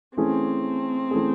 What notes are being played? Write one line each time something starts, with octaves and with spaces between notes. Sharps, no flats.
E3 A3 C4 C#4 G#4
E3 A3 C#4 G#4